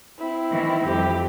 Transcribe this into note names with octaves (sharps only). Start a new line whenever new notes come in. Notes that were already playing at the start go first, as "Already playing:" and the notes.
C4 E4
D#3 E3
F2 G3 G4